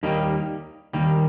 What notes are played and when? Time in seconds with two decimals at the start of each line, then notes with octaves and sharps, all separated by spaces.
0.03 D#2 D#3 G3 A#3
0.93 D#2 D#3 G3 A#3